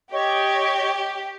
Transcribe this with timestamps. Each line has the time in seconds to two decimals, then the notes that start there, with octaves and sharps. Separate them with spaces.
0.12 G4 C#5 D#5 C#6